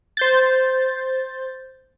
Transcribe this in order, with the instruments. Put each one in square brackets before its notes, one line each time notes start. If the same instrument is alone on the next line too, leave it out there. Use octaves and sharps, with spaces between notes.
[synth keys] C5 G6 A6